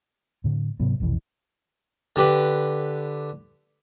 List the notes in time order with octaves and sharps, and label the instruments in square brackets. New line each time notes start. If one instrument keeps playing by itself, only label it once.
[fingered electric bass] A2 D3
G#2 C3 F#3 B3
F1 B1 F2 E3
[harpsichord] D3 G4 B4